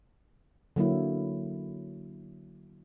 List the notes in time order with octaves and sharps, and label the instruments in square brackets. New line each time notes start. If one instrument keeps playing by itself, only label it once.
[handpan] D3 F#3 A#3 E4